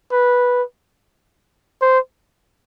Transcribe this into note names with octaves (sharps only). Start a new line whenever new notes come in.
B4
C5